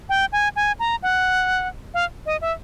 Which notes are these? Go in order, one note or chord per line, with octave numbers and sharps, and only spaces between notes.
G5
G#5
G#5
A#5
F#5
F5
D#5
E5